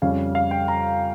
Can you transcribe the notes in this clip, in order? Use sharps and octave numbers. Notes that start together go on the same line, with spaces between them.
F2 C#3 G3 C#4 F5
F5
G5
A#5